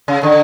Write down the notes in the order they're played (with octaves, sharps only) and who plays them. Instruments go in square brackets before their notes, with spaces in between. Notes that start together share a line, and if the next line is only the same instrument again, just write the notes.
[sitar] C#3
D3